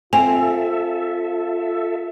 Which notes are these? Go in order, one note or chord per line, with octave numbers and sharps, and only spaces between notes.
C4 F4 A4 E5 G#5